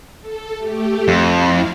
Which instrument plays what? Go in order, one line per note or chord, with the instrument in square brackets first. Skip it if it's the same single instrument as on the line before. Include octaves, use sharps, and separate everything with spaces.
[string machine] A4
A3 G4
[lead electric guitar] F2
[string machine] E4 F5